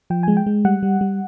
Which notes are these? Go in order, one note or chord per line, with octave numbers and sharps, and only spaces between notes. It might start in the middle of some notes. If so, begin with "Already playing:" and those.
F3 G5
G#3 G#5
G5
G#3
G3 F#5
G3
G3